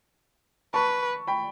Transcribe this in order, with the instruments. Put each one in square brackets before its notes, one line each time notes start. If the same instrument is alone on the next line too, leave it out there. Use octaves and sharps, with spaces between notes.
[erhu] B4 [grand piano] A5 C#6
[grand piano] G5 B5